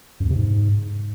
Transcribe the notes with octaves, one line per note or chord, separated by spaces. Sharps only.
F#2
E2
C3
G#2